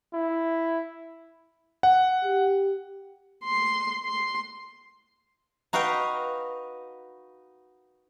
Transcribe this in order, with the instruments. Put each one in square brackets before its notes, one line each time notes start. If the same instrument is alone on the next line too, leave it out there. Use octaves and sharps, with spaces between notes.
[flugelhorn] E4
[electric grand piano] F#5
[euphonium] G4
[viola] C6
C6
[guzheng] D#4 F#4 B4 F5 G5